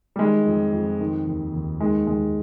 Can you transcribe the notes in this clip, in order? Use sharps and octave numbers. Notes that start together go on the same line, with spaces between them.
G3
D#3 G#3
F2
F2
D#3
D#2
D#2
D#3 G#3
D#2 G#3